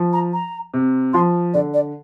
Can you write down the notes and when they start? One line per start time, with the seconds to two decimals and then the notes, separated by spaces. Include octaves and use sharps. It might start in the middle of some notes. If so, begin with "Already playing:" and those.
Already playing: F3
0.13 A#5
0.33 A#5
0.74 C3
1.13 F3 C6
1.54 D3 D5
1.74 D5